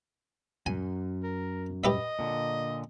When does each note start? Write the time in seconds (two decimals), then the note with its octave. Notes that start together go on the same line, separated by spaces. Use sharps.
0.66 F#2 G#5
1.23 A#4
1.84 G4 B4 D#5 E5
2.19 A#2 D3